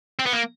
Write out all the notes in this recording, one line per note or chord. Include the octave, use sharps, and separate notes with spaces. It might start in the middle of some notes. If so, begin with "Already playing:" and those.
C4
B3
A#3